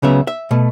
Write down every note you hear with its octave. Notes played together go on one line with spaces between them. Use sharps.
C#2 C#3 F#3 B3 E5
E5
B2 A3